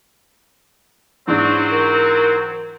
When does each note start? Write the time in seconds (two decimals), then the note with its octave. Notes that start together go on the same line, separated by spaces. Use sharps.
1.28 G#2 E3 F#3 C4 D4
1.72 A#4